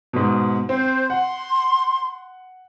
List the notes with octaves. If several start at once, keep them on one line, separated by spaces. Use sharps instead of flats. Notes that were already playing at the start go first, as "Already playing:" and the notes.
G#2 B2
C4 C5
F#5 C6